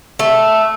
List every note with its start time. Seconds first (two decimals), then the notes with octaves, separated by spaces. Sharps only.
0.19 A3